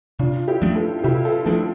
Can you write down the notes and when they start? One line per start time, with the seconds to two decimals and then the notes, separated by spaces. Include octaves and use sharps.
0.19 C3 D4 F4
0.48 E4 G4
0.62 F3 A3 D4
0.75 F4 A4
0.99 F4
1.04 C3 E4 G4
1.25 F4 A4
1.46 F3 A3 D4 F4 A4